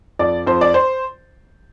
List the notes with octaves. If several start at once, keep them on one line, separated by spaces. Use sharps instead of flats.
F2 D5
F2 C5
D5
C5